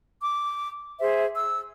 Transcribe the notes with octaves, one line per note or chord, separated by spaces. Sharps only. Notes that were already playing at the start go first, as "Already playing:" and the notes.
D6
G#4 C5 E5
E6